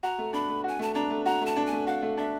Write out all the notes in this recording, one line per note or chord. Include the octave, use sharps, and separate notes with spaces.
F#4 A#5
A3
D4 B5
A3
F#4 G#5
A3 A5
D4 A#5
A3
F#4 A#5
A3
A5
D4
G#5
A3
F#4 F5
A3
D4 E5